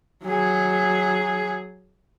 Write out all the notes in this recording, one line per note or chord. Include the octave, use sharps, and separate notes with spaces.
F#3 G#4